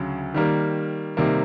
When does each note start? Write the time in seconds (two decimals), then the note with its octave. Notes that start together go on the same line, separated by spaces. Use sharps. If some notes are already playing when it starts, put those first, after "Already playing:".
Already playing: D2 C#3 F#3
0.34 D#3 G3 A#3
1.17 C3 D#3 G3 A#3